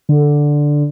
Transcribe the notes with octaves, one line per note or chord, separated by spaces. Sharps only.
D3